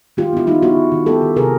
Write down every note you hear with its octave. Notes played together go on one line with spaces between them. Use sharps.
D#3 F4 G4
B3 E4
D#3 D#4 F4
B3 E4 F#4
D#3
D#3
B3 G4 A4
D#3
C3 G#4 A#4